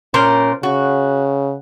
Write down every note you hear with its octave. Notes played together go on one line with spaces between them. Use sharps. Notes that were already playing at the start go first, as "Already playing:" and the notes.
A#2 C#4 A#4 C5
C#3 F#4